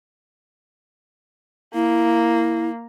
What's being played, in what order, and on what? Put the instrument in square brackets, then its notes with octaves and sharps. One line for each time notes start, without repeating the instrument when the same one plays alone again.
[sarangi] A#3 [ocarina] E4